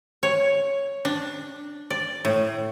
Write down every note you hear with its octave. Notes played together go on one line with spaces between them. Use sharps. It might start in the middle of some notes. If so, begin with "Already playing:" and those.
C#5
D4
D5
A2